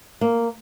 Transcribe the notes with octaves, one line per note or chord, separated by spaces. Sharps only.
A#3